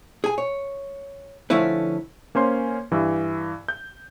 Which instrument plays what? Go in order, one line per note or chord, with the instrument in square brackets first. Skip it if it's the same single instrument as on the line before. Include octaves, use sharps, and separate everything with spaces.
[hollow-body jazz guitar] G#4 G#5
C#5
D3 F3 A3 C#4 E4 B4
[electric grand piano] A#3 C#4 C5 C6
G2 E3
G6